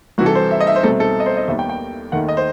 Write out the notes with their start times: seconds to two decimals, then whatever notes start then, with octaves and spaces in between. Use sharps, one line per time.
0.18 C2 C3 E3 F#4
0.26 A4
0.35 C5
0.51 E5
0.60 D#5
0.67 E5
0.76 C5
0.83 C2 B2 A3 C4 A4
1.00 A4
1.20 D#5
1.26 C5
1.37 D#5
1.48 D#2 D#3 G3 B3 E5
1.59 G5
1.69 G5
2.12 D#2 D#3 A3 F#5
2.29 D#5
2.37 C5